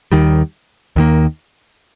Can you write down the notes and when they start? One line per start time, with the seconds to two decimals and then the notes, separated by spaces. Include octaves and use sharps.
0.12 D#2 D#3 G3
0.96 D#2 D#3 A#3